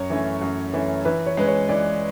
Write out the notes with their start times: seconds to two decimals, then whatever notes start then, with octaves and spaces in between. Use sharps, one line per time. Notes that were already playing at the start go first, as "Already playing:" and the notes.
Already playing: F#2 C#5
0.10 E3 A3 C#4
0.41 F#2
0.74 E3 A3 C#4
1.05 E3 B4
1.26 C#5
1.37 G#3 C#4 B4
1.48 C#5
1.69 E3 D5